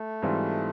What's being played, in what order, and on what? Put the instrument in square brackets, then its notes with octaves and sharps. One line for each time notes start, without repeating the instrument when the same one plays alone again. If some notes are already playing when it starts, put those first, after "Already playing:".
Already playing: [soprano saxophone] A3
[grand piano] G#2 E3 G3 C4 F4